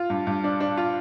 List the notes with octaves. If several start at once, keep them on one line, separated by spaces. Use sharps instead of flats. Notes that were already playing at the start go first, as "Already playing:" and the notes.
Already playing: F4
G2
G2
D4
D4
F4